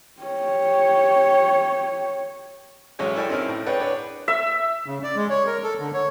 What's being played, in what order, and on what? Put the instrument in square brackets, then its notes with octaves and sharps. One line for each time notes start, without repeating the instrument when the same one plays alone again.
[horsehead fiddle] G4 C#5
[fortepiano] A1 F#3 G#3 C#4 C#5 G#5
E4 A4 A#4 D5 G5 G#5
C4 C#4 D#4 E4 A#4
A2
G#4 B4 C#5 D5 F#5 G5
D4 B4 C#5
[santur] E5
[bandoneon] C#3
D5
G#3
C#5
A#4
A4
D3
C#5